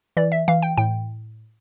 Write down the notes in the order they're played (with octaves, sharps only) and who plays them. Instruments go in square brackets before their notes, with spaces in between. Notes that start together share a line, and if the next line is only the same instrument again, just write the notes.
[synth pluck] E3 D5
E5
E3 F5
G5
A2 G5